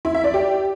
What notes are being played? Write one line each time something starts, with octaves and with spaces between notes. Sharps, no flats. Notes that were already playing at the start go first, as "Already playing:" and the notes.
E4
E5
D5
G4